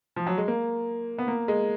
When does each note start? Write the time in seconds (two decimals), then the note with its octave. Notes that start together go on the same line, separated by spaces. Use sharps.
0.16 F3
0.27 F#3
0.38 G#3
0.48 A#3
1.18 B3
1.28 A#3
1.48 G#3